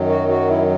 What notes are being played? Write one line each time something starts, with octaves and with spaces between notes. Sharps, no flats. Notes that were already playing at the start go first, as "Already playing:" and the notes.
Already playing: F#2 D#3 F#3
F#4
F#4
E4